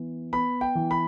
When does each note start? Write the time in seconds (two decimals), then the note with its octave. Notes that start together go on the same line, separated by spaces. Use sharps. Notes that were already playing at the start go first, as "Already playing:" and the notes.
Already playing: E3 B3
0.33 B3 B5
0.61 G5
0.75 E3
0.91 B5